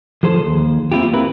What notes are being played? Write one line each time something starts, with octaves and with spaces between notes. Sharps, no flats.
F3 G#4 A4 C5
D#2
A#3 C4 E4 F4 G4
C4 E4 A#4 B4